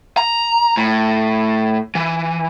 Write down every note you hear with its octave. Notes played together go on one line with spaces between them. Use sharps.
A#5
A2
E3